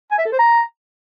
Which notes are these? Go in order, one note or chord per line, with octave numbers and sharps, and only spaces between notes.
G#5
E5
A4
C5
A#5